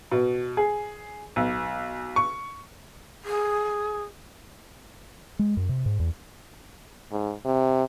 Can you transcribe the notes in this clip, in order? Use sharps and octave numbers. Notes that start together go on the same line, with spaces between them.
B2
G#4
B1
C#6
G#4
G#3
F#2
C3
G#2
E2
G#2
C3